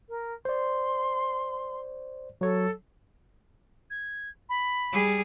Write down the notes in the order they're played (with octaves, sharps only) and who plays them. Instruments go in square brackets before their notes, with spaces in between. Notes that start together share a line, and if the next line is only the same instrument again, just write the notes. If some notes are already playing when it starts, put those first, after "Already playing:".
[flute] A#4
[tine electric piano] C5 D5 [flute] C6
[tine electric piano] F#3 C#5 [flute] A4
[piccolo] G#6
B5
[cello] G3 G#4